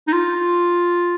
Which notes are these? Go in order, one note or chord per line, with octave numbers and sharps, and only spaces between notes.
D#4
F4